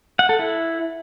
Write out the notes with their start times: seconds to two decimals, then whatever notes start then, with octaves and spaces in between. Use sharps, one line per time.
0.19 F#5
0.29 A4
0.39 E4